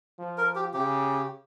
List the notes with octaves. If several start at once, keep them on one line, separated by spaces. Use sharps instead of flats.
F3
A#4
G4
C#3 G4